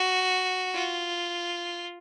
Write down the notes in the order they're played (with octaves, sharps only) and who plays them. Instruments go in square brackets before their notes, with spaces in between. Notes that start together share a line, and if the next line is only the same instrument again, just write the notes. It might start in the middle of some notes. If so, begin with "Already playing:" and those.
Already playing: [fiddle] F#4
F4